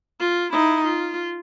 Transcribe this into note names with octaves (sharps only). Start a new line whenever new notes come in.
F4
D#4 E4
F4